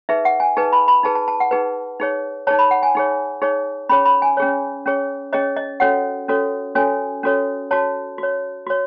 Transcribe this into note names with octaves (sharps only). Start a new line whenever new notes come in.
D#4 G#4 B4 E5
F#5
G#5
D#4 G#4 B4 A5
B5
B5
D#4 G#4 B4 A5
A5
A5
F#5
D#4 G#4 B4
D#4 G#4 C#5
D#4 G#4 C#5 A5
B5
F#5
G#5
D#4 G#4 C#5
D#4 G#4 C#5
C#4 G#4 C#5 B5
B5
G#5
C#4 G#4 C#5
C#4 G#4 C#5
C#4 G#4 C#5 D#5
D#5
C#4 F#4 A4 C#5 F#5
C#4 F#4 A4 C#5
C#4 F#4 A4 C#5 G#5
C#4 F#4 A4 C#5
F#4 C#5 A5
F#4
C#5
F#4 C#5